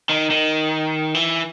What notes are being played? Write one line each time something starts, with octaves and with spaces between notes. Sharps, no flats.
D#3
D#3
E3